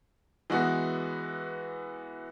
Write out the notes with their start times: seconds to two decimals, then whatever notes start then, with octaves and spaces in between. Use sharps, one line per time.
0.50 E3 G#3 B3 F#4